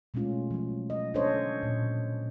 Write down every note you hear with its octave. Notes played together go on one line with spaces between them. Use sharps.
B2 G#3 A3 C#4 F4
F3 F#3
D#5
C#4 D4 A4 C5 C#5 D#5
A#2